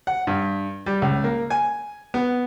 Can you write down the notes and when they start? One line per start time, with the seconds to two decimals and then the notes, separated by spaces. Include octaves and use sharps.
0.07 F#5
0.27 G2
0.86 G3
1.02 C#2
1.24 A#3
1.50 G#5
2.14 B3